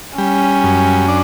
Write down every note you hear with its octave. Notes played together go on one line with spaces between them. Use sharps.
G3 C#4
F#2
D4